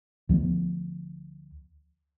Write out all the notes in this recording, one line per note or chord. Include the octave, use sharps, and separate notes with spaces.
D2 F3 G3 B3